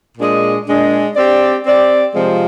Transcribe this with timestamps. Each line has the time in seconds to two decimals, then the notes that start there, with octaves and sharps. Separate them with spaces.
0.17 A#2 G#3 D4 G#4 D#5
0.66 A#2 G#3 D4 G#4 D#5
1.15 C4 G4 D5
1.65 C4 G4 D5
2.14 C3 F3 G#3 C4 F4